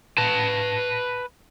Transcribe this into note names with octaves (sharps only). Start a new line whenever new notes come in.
B4 A5